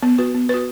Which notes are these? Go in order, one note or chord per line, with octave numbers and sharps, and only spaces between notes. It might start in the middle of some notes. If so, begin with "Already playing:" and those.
B3
F#4 B4
B3
F#4 B4